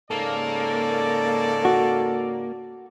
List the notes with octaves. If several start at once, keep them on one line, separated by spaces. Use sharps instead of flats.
G#2 C#3 A#3 A4 D5
F#4